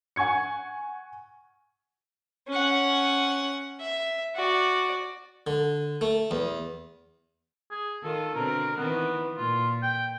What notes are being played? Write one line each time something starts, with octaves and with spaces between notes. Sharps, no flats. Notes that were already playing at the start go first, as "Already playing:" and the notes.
F#5 G#5 C#6 G#6 C#7
C#4 F#5
E5
F#4 D5
D3
A3
E2
G#4
D#3 F4 A4
B2 D3 C4 A#4
D#3 E3 B3 C4
A#2 F4
G5